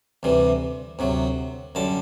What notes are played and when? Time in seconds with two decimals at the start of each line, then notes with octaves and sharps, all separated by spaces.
0.23 D2 C3 E3 G3
0.99 D2 C3 F#3
1.75 F#2 D3 G3 A5